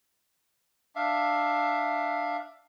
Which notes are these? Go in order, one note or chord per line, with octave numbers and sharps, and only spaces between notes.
D4 E5 F5